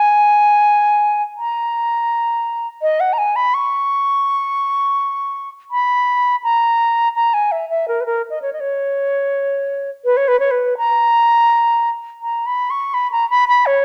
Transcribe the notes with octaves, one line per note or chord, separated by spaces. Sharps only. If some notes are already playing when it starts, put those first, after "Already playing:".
Already playing: G#5
A#5
D#5
F#5
A#5
G#5
B5
C#6
B5
A#5
A#5
G#5
E5
E5
A#4
B4
A#4
D#5
C#5
D#5
C#5
B4
C#5
B4
C#5
B4
A#5
A#5
B5
C#6
B5
A#5
B5
B5
C#5